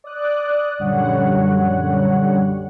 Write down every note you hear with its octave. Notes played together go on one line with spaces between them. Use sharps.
D5 D#6 F#6
A#1 F#2 D3 G3 C#5 F#5